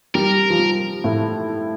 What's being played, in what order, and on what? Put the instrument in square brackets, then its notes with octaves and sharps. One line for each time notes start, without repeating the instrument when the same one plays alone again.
[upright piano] G3 [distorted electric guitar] A#4
[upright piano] F3
G3
A2 A3